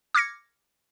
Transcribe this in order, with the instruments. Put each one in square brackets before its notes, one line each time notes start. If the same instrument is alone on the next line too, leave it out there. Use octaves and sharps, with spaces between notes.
[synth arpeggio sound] D6 F6 G#6 A#6 C#7